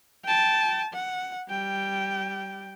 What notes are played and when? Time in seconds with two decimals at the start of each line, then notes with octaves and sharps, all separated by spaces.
0.25 G5 A5
0.93 F#5
1.49 G3 G5